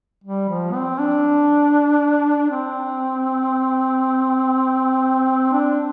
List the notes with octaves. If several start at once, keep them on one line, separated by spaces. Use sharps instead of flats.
G3
F3
C4
D4
C4
D4